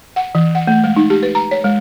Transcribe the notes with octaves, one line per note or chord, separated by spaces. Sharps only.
F#5
E3
F#5
A3
G#3
D#4
G4
B4
A#5
C#5
G#3